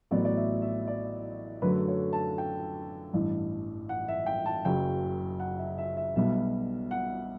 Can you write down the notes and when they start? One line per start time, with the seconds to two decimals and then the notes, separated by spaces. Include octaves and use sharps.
0.11 A1 A2 F#3 B3 D5
0.25 D5
0.37 E5
0.62 E5
0.88 D5
1.62 F#2 D3 F#3 A3 B4
1.88 C#5
2.13 A5
2.38 G5
3.13 A1 G2 E3
3.89 F#5
4.08 E5
4.26 G5
4.46 A5
4.65 F#1 F#2 C#3 F#3 G5
5.40 F#5
5.59 E5
5.78 E5
5.97 E5
6.16 B1 B2 G3 B3 E5
6.91 F#5